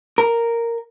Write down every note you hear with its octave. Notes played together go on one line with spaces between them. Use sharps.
A#4